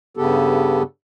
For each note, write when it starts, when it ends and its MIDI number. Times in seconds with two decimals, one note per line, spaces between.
0.17 0.83 43
0.17 0.83 49
0.17 0.83 59
0.17 0.83 67
0.17 0.83 69